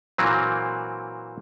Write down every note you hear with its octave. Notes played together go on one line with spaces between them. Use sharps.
A#2 E3 F#3 A#3 C4